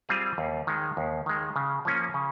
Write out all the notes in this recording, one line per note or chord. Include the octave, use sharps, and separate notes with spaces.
G3 C4 F4 G#4
D#2
D#3 G#3
D#2
D#3 G#3
C#3
F3 A#3 C#4
C#3